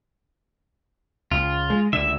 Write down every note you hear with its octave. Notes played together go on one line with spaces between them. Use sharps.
C#2 F4
G#3
C#2 D3 E5